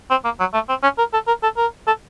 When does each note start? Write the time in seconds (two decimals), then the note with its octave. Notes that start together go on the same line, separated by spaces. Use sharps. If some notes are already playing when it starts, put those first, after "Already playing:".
0.10 C4
0.24 A#3
0.40 F#3
0.54 A3
0.69 C4
0.83 C#4
0.98 A#4
1.13 A4
1.27 A#4
1.43 A4
1.57 A#4
1.87 A4